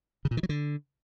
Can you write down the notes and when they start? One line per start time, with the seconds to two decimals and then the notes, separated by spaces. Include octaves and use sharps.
0.25 C#3
0.31 A#2
0.37 D#3
0.43 F#3
0.49 D3